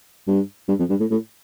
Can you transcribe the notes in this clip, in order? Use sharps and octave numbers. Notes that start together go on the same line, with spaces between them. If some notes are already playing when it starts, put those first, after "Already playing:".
G2
G2
F2
G2
A2
A2